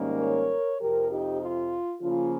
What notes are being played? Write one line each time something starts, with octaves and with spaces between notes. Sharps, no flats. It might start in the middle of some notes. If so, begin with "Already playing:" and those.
Already playing: G#2 D#3 G3 A#3 C#4
A#4 C#5
F2 C3 F3 G4 A#4
D#4 G4
F4
C#3 F3 A#3 C#4 F4